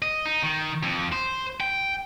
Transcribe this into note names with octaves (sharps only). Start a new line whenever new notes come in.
D#5
D#4
D#3
F2
C5
G5